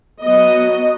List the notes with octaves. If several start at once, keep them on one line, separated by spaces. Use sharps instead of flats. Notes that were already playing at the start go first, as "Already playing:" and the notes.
F#3 B3 D#5